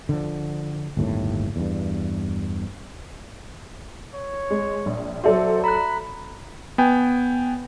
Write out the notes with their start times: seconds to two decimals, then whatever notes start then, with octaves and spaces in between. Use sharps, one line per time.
0.09 D3 F3
0.97 G1 D#2 A2
1.56 E2 G2
4.14 C#5
4.50 G#3
4.86 A#1
5.24 F#3 F#4 A4 C5 D5 E5
5.64 A#5 B5 F#6
6.78 B3 G5 G#5